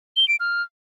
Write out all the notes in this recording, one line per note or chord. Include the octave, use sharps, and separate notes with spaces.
G7
D7
F6